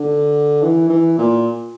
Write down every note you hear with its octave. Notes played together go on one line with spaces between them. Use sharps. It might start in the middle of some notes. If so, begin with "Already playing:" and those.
Already playing: D3
E3
E3
A#2